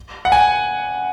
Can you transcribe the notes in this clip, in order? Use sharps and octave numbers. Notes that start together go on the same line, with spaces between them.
F#5
G#5